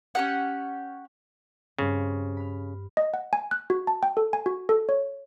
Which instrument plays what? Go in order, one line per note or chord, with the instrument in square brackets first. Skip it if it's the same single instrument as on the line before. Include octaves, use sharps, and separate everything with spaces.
[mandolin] C#4 G4 F#5
[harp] G2 C4 [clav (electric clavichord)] C#3
[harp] B5 F6
[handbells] D#5
F#5
G#5
F#6
F#4
A5
G5
A4
G#5
F#4
A4
C#5